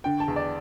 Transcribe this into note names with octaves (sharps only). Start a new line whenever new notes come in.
D3 G5
A5
E2
D5